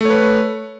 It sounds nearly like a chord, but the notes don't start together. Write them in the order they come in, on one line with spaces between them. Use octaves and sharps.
A3 C#5 B4